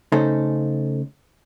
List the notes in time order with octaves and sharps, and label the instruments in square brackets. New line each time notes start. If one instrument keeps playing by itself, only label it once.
[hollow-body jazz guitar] C#3 A3 C#4 D#4 A4 C5